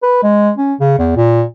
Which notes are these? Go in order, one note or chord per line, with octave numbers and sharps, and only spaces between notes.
B4
G#3
C#4
C#3
E2
A#2